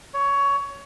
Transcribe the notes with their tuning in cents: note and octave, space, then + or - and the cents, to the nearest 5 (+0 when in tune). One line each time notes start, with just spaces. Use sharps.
C#5 +15